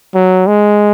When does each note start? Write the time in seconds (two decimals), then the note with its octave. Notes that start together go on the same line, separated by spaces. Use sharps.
0.15 F#3
0.47 G#3